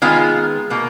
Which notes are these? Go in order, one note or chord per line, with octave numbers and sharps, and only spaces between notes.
D#3 G#3 B3 F4
B2 A#3